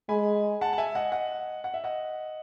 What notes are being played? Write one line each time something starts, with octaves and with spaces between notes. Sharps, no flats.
G#3 G#5 B5
F#5 A5
A5
E5 G#5
D#5 F#5
D#5 F#5
F#5
E5
D#5 F#5